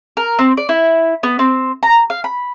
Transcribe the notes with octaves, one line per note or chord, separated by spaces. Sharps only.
A#4
C4
D5
E4
B3
C4
A#5
F5
B5